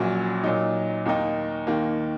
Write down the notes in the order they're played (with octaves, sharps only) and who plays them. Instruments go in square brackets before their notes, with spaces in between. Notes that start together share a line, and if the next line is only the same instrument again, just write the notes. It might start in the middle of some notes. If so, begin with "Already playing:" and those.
Already playing: [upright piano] A#1 A#2 F#3 C#4 F#4
A#2 F#3 D#4
D#2 D#3 A#3 D#4
D#2 D#3 A#3